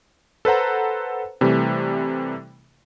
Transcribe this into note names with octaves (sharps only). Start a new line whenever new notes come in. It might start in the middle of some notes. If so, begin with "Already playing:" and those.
A4 B4 C5 F#5 A#5
C3 E3 G3 A3